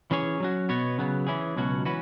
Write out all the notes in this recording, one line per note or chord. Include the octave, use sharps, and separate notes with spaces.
E3 C#4 G#4 C#5
F#3 C#4 F#4
B2 B3 F#4 C#5
C#3 F#3 B3
E3 C#4 E4 G#4
C#2 B2 F#3 C#4 F#4
E3 C#4 F#4 B4